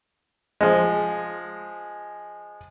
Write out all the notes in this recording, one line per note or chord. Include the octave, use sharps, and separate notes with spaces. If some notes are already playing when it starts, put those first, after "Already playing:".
F3 G#3